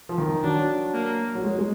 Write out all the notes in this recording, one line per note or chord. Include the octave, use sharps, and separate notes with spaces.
F3
D#3
F#3 D4
A#3
F#3
G#3
G#3